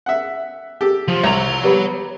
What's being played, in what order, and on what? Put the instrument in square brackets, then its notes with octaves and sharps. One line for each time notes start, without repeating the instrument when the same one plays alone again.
[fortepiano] E5 F#5
G4 A4
[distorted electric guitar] F3
[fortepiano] C2 [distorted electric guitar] C#5 A#5
[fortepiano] G3 B3